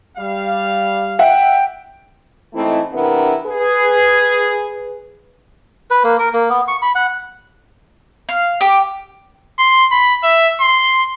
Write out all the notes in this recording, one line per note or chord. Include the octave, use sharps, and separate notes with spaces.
G3 F5
E5 F#5 G5
E3 G#3 A3 C4 D#4 E4
C3 E3 B3 D4 E4 A#4
G#4 B4
B4
A#3
A#4
A#3
B3
C#6
B5
F#5
F5
G4
C6
B5
E5
C6